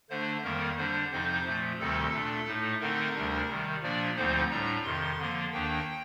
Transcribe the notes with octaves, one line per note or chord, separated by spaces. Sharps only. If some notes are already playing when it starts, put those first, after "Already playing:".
D3 A3 D4 C5
F2 D#3 G3 A#3 A#4
D3 G3 D4 C5
F2 C3 F3 C4 D#4 C5
A#2 F3 A3
D2 C3 D#3 G3 C4 A4
A#2 A3 D4
A2 A3 D#4
D3 A3 C4 D#4 A#4
D2 C3 G3 D4
C3 D#3 G3
A#2 F3 A#3 D4 D5
D2 D3 F3 C4 D#4 C5
A2 G3 D4 A#5
F2 C3 D#3 C6
D3 F3 A#3
D#2 D#3 A#3 D4 G5